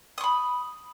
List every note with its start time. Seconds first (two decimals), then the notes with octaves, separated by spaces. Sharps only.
0.18 D#6
0.21 C#6
0.24 B5